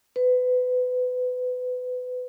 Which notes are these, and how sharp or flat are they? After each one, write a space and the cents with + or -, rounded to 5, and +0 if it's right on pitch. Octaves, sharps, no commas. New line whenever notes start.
B4 +25